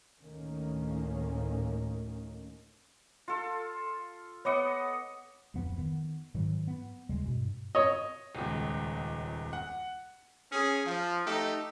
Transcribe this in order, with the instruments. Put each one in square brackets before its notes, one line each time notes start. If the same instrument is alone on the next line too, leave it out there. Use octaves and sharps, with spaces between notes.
[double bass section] D2 A2 D#3 A#3 C#4
[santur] F4 A4
[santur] B3 D#5 F#5 [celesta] C#5 D6 C#7
[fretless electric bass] D1 F2 F3 B3
D#3 B3
G#2 D#3 E3 F#3
B3
D#2 C#3 G3 G#3
G2 B2
[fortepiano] C#5 D#5
[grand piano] D#1 C#2
F#5
[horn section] C#4 G#4
F3
A3 D#4 G4 A4